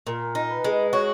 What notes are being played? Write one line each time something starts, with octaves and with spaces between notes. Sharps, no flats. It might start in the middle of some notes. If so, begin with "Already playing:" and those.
A#2 A#4
D#4
B4
G#3
F#4 C#5